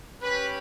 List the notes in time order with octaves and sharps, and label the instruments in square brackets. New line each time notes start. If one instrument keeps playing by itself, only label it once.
[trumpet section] C#4 G4 B4